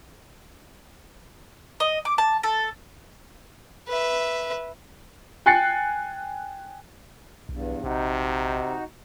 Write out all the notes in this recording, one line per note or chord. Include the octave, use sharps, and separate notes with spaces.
D#5
D6
A5
A4
B4 E5
G5 G#5 F#6 A6 C7 C#7
B1 E2 G2
A#1 C3 D#4 F#4